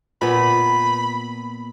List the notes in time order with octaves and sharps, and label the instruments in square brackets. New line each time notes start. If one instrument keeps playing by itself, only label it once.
[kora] A#2 B3 [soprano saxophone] B5